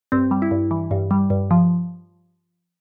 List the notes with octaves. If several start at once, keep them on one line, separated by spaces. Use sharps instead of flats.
G2 C4
G3
E4
G2
E3
G2
G3
G2
F3